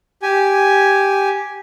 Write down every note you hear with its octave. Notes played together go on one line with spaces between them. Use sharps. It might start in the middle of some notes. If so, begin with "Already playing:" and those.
G4 G#5